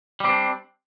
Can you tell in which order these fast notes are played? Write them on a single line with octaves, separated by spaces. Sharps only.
G3 C4 D4